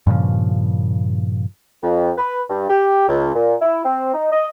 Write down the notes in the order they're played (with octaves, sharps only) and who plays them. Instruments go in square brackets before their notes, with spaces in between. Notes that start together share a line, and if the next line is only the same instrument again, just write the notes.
[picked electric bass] G2 A#2 C#3 F3
[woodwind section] F2
B4
G2
G4
C#2
A#2
E4
C4
D#4
D#5